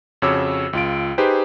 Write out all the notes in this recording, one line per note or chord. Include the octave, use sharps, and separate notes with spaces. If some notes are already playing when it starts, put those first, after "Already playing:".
F2 C#3 F#4 C#5 D6 E6
C#2 F4 D7
D#4 G4 G#4 B4 C5